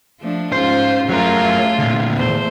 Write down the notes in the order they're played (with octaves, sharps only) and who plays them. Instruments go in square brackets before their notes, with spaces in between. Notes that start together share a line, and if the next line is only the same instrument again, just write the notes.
[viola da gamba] F3 A3 D4
[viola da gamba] G#2 C#4 F4 [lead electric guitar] C5
[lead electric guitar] F#3 A#4 [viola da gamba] A3 F4 G#4
[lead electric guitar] A#2 D3
[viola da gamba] E2 A3 C5